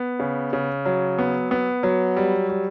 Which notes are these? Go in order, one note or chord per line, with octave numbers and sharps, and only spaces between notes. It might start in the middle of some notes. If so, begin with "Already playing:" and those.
Already playing: B3
C#3
C#3
F#3
B3
B3
F#3
G3
G3